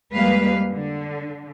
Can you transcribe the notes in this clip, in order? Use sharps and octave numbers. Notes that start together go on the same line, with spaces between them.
F2 G3 G#3 A#3 B4 F5
D3